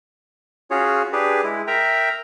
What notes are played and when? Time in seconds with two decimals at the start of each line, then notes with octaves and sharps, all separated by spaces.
0.71 C#4 F4 F#4 G#4 C#5
1.13 D4 G4 G#4 B4
1.44 G#3 E4
1.67 A#4 E5 G5 A#5